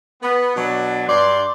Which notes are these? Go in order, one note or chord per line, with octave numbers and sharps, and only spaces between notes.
B3
B2 F#3 D4
G2 D5 C6